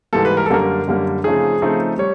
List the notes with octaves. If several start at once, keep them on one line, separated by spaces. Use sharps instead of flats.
G#2 E3 G3 A#3 A4
B4
A#4
A4
F#2 D3 G3 A#3 A#4
F#2 D3 G3 A#3
C#3 F3 A3 C4 D#4 G#4
C#3 F3 A3 C4 D#4
G3 C#5